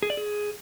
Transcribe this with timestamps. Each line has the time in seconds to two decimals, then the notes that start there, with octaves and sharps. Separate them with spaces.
0.03 G#4
0.10 D5
0.17 G#4